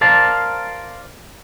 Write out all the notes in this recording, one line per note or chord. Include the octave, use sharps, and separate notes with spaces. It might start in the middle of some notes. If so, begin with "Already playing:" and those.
A#4 C5 D5 F5 A5